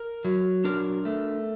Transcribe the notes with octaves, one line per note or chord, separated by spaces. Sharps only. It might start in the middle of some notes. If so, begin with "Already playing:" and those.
Already playing: A#4
F#3
D4 A#4
A3